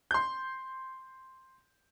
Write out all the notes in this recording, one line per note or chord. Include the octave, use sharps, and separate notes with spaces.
C6 G6